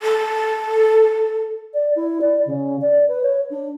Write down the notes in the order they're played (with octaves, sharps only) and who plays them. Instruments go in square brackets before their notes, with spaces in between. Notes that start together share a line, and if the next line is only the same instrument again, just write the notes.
[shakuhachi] A4
[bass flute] D5
E4
D5
C#3
D5
B4
C#5
D4